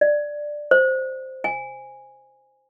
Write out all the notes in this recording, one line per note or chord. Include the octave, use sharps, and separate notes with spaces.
D5
C5
G#5